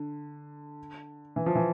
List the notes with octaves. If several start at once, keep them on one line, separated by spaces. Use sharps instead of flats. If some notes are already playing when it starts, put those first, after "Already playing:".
Already playing: D3
E3
F3
E3